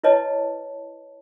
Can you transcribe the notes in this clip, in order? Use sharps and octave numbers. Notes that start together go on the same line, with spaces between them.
E4 B4 C#5 D#5 A5